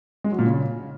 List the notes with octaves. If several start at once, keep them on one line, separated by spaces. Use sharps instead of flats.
G#3
F#3
A#2
C#3